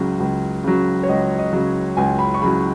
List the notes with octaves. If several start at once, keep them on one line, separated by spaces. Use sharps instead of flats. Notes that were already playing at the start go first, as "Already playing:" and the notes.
Already playing: C#2 C#3 F#3
C#2
C#3 F#3
C#5
C#2 D#5
D#5
C#3 F#3
C#2 G#5
B5
C#6
C#3 F#3 B5